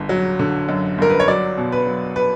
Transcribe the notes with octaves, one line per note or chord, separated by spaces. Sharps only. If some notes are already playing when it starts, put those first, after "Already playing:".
Already playing: G1 D3
F#3
D3
F#2
G1 A#4
B4
C#5
F#3 D5
B2
B4
F#3
B4